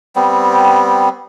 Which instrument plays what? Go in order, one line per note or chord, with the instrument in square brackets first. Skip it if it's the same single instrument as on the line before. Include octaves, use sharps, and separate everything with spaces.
[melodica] G3 B3 C4